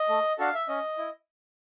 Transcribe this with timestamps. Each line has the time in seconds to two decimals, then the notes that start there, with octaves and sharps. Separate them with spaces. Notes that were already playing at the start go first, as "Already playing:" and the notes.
Already playing: D#5
0.09 A3
0.38 D4 F#4 A4 F5
0.54 E5
0.68 C#4 D#5
0.98 E4